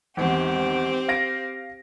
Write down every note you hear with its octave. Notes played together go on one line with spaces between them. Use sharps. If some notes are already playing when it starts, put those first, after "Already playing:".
G#1 E2 C4 G4
F5 A#6 D7